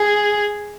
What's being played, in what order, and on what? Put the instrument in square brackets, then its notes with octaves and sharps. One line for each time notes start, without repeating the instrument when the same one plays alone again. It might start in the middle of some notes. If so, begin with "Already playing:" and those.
Already playing: [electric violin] G#4